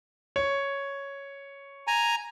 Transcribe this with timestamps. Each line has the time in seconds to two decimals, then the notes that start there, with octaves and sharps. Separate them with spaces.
0.36 C#5
1.87 G#5 A#5